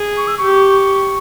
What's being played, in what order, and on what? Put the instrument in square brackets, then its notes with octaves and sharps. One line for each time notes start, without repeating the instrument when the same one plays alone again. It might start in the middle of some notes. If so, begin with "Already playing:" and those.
Already playing: [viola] G#4
[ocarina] C#6
E6
C#6
[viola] G4